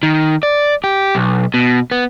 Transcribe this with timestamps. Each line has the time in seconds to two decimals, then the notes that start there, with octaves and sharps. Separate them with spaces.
0.03 D#3
0.43 D5
0.84 G4
1.15 B1
1.54 B2
1.91 B3